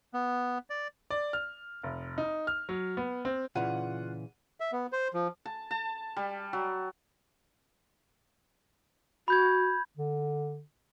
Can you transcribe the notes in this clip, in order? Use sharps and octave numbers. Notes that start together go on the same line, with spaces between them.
B3
D5
D5
F6
F1
D#4
F6
F#3
B3
C4
A#2 C#3 E3 F4 F#5 D#7
E5
B3
C5
F3
A5
A5
G3
F#3
F#4 B5 G6 G#6
D3